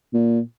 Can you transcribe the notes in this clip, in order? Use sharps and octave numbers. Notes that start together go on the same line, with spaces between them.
A#2